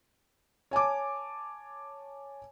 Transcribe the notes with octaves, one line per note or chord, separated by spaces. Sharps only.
C#5 G#5 A5 D6